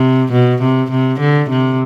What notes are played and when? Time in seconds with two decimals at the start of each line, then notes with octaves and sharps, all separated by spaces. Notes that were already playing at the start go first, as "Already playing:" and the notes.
Already playing: C3
0.33 B2
0.62 C3
0.91 C3
1.20 D3
1.50 C3